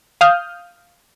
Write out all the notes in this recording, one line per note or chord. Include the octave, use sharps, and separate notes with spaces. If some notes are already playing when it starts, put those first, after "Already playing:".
F5 D#6 F6 G6